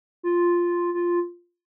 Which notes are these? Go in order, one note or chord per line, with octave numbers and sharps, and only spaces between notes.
F4
F4